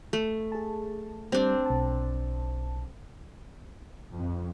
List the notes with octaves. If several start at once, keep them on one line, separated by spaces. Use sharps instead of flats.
A3
G#4 A5
G3 C4 D4
B1 A5
F2